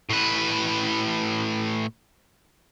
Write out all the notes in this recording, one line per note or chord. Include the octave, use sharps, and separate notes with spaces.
A2 B4